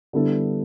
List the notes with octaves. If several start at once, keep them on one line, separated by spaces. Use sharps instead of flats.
D3 G3 B3 E4 A4